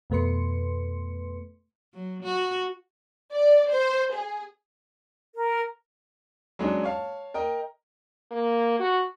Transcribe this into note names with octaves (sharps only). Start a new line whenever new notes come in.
F2 B2 A3 B4 C6 C#7
F#3
F#4
D5
C5
G#4
A#4
F#3 G#3 C#4 D4
C#5 F5 A5
A#4 D#5 G5 A#5
A#3
F#4